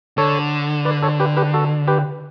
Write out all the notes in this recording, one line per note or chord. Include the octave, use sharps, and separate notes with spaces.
D3 A4 C#5
B4 D5
A4 C#5
G4 B4
G4 B4
F#4 A4
G4 B4